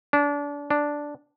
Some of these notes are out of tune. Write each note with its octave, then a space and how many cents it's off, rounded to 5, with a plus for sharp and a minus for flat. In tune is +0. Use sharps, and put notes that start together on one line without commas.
D4 -30
D4 -5